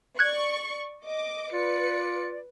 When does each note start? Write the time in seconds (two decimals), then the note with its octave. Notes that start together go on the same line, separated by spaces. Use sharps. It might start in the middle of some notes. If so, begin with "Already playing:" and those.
0.19 D5 C#6 F#6 G#6
1.05 D#5 D6
1.53 F4 B4 D5 C#7